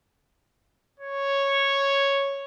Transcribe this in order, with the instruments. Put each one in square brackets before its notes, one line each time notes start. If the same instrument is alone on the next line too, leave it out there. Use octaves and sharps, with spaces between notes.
[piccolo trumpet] C#5